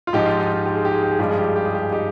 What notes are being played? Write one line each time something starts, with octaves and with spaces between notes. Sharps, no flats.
F4
G#2 F3 G#3 D#4 G4
F4
D#4
D#4
G4
G#4
G4
G#4
G4
G#4
G2 F3 G#3 G4
G#4
G4
G#4
G4
G#4
G4
G#4
D#4 G4